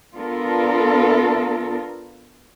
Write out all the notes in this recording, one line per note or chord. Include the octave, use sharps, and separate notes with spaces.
B3 D4 F4 A4 A#4